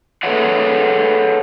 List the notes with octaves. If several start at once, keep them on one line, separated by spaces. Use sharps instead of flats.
G#4 A4 B4 C#5 E5 F#5